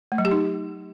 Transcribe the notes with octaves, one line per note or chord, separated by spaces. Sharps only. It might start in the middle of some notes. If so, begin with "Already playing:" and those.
A3
F#3
G4
D#4